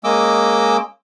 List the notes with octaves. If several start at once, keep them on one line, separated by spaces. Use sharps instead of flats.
G#3 A#3 C#4 D#5 D6 E6